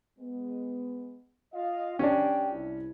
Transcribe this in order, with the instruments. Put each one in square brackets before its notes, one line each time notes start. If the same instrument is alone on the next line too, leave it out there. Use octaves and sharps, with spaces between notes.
[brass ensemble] G#3 B3
F4 D#5 F5
[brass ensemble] C#2 G4 G5 [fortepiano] C#4 D4
[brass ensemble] C2 E4